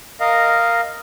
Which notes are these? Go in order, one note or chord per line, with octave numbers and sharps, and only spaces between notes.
A#4 D#5 F5